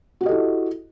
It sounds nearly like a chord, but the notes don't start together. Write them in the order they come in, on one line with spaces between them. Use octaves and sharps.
F#4 G4 D#5 A4 E4